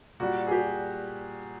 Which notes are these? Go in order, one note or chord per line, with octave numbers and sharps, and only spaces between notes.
A#2 G3 F#4
G#4
G4